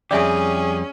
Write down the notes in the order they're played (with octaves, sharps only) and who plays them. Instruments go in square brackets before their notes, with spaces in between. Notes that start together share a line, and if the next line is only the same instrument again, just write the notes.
[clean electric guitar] F2 G3 G4 [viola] C#4 [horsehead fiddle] G#4 [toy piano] D5 E5 G#5